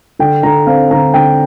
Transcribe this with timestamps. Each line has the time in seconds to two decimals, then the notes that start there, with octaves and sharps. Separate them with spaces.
0.19 D3 G5
0.43 D3 A#5
0.67 C4 F5
0.91 D3 A#5
1.14 D3 G5